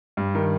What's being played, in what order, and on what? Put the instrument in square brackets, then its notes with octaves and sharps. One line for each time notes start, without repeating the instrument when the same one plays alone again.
[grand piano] G2
D#3